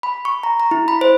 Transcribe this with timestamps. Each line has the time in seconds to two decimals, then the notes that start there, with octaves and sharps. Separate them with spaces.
0.03 B5
0.25 C#6
0.43 A#5
0.60 A#5
0.71 E4
0.88 B5
1.01 C5